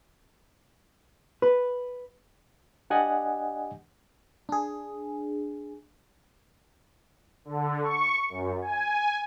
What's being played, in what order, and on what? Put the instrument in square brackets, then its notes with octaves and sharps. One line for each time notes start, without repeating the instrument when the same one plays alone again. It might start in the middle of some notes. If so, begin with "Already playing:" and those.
[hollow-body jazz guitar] B4
[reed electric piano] D4 G4 D5 D#5 F#5 G#5
[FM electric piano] D4 G#4
[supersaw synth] D3
C#6
F#2
G#5